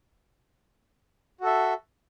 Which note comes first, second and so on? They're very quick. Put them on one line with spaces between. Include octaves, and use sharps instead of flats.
F#4 A4 E5